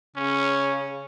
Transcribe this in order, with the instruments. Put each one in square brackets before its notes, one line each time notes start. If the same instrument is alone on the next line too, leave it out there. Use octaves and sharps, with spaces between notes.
[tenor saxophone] C#3 [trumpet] C#4